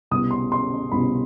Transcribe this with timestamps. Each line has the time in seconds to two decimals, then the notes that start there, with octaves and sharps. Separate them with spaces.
0.11 C2 B2 G3 B3 D#6
0.31 C6
0.52 C6
0.92 C2 B2 G3 B3 B5